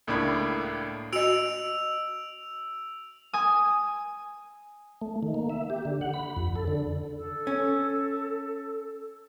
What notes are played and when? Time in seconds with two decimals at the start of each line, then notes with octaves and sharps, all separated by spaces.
0.07 C#2 A2 A#3 D4 B5 G#6
1.13 F#4 D#5 E6 D7 F7
3.33 G#5 D#6
5.01 A3
5.23 D#3
5.34 A#3
5.50 E5
5.70 G4
5.85 D3
6.01 F#5
6.14 B5
6.36 F2
6.56 A4
6.68 D3
7.16 A4
7.47 C#4